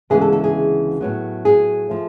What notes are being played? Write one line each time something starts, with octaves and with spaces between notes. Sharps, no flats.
D2 C#3 E3 G#3 B3 G#4
A4
A4
G#4
A2 F#3 B3
G#4
F3 A3